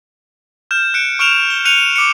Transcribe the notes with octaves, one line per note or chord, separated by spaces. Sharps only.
F6 G6 E7
F#6 C#7 D7
C#6 F6 D7 E7 F7
G7
F#6 C#7 D#7 F7
D6 C#7